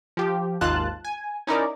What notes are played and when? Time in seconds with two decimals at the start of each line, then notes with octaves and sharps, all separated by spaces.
0.17 F3 G4
0.61 G#1 D#2 G#2 F4 A5 F#6
1.05 G#5
1.47 C#4 D#4 E4 A#4 D5